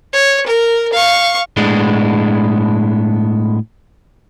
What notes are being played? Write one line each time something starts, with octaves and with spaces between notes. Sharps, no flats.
C#5
A#4
F5 C#6
A2 G#3 B3 D4